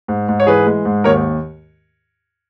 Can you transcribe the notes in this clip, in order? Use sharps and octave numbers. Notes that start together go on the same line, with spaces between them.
G#2
G#2
C#5
E3 G#4 B4
G#3
G#2
D#2 A#4 C#5